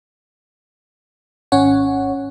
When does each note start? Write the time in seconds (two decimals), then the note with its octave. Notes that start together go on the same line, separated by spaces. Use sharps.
1.52 G#1 C#4 C#5 F#5